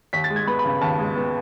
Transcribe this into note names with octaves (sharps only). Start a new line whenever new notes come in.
D#2 B6
A6
G#3
G#6
B3 B5
B5
C#3
D#2 A5
G#3
B3